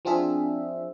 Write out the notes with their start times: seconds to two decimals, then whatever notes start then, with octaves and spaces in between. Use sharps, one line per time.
0.05 F3 C4 D4 F4 G#4 E5